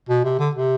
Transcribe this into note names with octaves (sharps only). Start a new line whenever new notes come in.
B2
C3
D3
C3